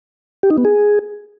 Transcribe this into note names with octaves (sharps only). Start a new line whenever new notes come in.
G4
D#4
B3
G#4